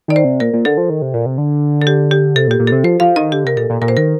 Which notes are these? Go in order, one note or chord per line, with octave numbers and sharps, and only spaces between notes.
D#3 D5
C5
C3
A#2 A#4
A#2
D3 A4
F3
D#3
C3
A#2
C3
D3
A4
G4
G4
C3 A4
A#2
G4
A#2
C3 A4
F3 C5
F3 F5
D#3 D#5
D3 G4
C3 A#4
A#2 A4
A#2
A#2 A#4
C5
D#3 A#4